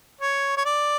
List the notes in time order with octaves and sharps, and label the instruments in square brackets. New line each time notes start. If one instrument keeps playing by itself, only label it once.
[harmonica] C#5
C#5
D5